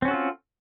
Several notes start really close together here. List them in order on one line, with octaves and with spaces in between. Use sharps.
C4 C#4 F#4 A4 F4